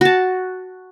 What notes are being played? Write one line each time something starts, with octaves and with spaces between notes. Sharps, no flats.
F#4 A5